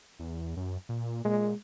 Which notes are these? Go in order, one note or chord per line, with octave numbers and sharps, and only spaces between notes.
E2
F#2
A#2
A#2 G#3